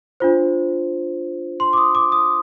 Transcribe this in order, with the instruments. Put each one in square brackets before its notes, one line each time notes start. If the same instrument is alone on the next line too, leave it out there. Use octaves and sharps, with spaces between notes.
[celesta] D4 F4 C5
C6
D6
D#6
D6
D#6